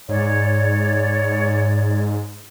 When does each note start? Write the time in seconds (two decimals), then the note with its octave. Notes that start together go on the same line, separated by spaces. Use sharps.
0.09 G#2 C#5 D5